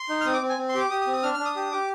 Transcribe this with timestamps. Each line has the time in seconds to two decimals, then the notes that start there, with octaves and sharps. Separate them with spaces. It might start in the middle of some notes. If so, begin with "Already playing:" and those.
Already playing: C6
0.09 D#4
0.21 F6
0.25 C4 D#6
0.34 D6
0.42 C4
0.49 G#5
0.58 C4
0.69 C6
0.75 G4 D6
0.90 G4 D#6
1.01 D#6
1.07 C4
1.13 D#6
1.23 D4 F6
1.34 F6
1.39 D4
1.45 D#6
1.56 G4 D#6
1.72 G4 D6